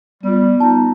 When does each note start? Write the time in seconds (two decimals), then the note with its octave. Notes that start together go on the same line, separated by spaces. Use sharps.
0.23 G3 B3 F4
0.60 D#4 A5